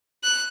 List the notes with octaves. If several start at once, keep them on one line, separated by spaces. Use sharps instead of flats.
F#6